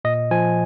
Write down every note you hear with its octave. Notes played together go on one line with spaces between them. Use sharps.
A#2 D#5
F3 G#5